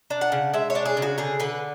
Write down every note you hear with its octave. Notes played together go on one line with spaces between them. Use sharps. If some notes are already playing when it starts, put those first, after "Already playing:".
D4
F#5
C#3
G#3 E5
C#5
D4
G#4
C#3
F#4
D3 G#4
D3 B4